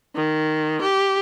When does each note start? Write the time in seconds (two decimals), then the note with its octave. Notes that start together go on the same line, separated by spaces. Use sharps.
0.16 D#3
0.82 G4